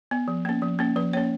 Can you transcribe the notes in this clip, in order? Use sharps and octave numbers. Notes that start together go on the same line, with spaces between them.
B3
F3
A#3 C#4
F3
A#3 C#4
F3 B4
A#3 C#4 C#5